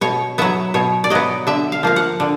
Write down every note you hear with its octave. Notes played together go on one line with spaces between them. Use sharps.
B2 C#5
F#3 B3 E5
B2 C#5
D5
F#3 B3 D#5
D3 E5
F5
F3 A#3 F5
F#5
D3